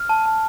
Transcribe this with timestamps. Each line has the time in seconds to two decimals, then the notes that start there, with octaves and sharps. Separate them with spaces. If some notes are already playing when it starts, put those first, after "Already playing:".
Already playing: F6
0.09 A5
0.26 A5